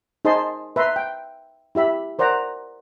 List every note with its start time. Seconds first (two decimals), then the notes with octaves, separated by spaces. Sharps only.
0.25 D#4 G#4 C5 D#5 A5 C6
0.76 B4 E5 A#5 C6
0.96 G5
1.75 E4 G4 E5 B5
2.19 A#4 C5 D5 F#5 A#5